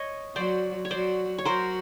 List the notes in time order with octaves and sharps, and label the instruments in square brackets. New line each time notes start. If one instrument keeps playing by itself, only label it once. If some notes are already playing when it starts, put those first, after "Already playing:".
Already playing: [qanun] C#5 D#5
[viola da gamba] F#3 F#4 [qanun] C5 D5
[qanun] C#5
[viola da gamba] F#3 F#4 [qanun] C5 D5
[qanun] C#5
[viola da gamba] F#3 F#4 [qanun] A#4 C5